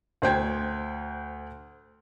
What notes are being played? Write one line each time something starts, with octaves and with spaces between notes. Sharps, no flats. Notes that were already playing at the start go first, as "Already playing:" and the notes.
D2 C5 G5 G#6